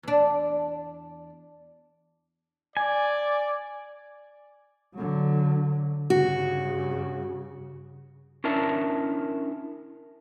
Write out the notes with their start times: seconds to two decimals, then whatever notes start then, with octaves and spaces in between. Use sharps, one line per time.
0.03 E2 D4
2.77 D5 G#5
4.94 D3 F#3
6.10 G2 C#3 F#4
8.44 C#4 D4 E4 A#4 E5 A5